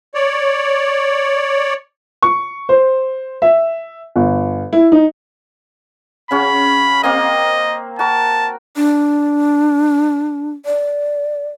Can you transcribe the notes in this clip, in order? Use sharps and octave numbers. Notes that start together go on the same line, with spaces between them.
C#5 D5
C#6
C5
E5
G1
E4
D#4
C#3 C#4 F#4 B5
A#3 C4 D#5 F5
F#4 A#4 A5
D4
D5